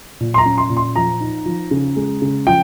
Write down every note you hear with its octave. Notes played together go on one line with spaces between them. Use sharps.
A#2
C6
A#5
C#4
C6
A#2
C6
F3 A#5
D#4
F3
C#3
G#3
C#3
F3 G5